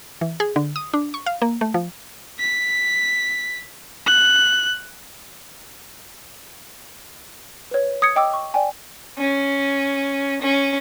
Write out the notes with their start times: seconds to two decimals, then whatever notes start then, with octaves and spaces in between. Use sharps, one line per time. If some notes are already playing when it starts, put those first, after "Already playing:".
0.21 E3
0.40 G#4
0.56 D3
0.76 D#6
0.93 D4
1.14 C#6
1.26 F5
1.42 A#3
1.61 A3
1.74 F3
2.39 B6
4.06 F#6
7.71 B4 C#5
8.02 D#6 G#6 C#7
8.16 D#5 G5 D6 E6
8.33 C#6
8.54 D5 G5 G#5
9.18 C#4
10.41 C#4